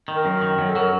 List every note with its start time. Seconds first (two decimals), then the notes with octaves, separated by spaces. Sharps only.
0.08 D#3
0.16 A#4
0.25 F#2
0.42 D#3
0.59 F#2
0.69 A4
0.76 F#3 A#4